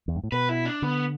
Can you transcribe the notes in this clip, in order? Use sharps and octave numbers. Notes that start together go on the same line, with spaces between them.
E2
G2
A2
B2 B4
E4
D4
D3 B3